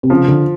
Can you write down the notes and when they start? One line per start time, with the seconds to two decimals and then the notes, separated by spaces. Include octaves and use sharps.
0.03 C3
0.10 C#3 F3
0.28 D3